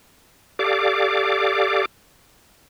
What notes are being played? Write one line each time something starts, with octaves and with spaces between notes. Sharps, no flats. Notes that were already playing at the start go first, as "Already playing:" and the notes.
G4 A4 D5 F5 D6